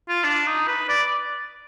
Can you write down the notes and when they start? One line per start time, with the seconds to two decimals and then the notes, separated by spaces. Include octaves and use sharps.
0.09 F4
0.24 D4
0.47 D#4
0.67 B4
0.89 D5